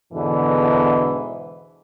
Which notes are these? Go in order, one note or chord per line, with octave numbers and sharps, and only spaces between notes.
E2 G#2 B2 D3 E3